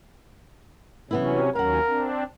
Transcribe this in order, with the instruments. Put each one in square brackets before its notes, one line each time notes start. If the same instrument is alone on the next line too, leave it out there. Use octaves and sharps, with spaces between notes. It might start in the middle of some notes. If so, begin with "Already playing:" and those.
[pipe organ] C3 F#3 C#4 [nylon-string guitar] E3 B3 E4
[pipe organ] D#2 F#3 C#4 [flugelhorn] A#4 [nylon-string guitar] F5 F#5
[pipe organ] C4 D4